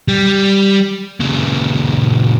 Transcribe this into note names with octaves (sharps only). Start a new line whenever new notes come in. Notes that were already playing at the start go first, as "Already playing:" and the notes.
G3
A#2 C#3